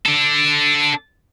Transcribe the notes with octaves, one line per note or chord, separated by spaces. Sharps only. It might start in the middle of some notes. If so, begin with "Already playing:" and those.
D4 A4